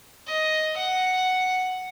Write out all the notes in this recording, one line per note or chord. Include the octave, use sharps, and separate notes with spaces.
D#5
F#5